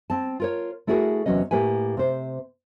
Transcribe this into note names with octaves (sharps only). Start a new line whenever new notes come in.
C4 A5
F4 A#4 C#5
A3 E4 F#4 G#4 A#4
E2 C3 F#3 C#4 D#5
A2 A#3 G4 B4 G#5
C3 C5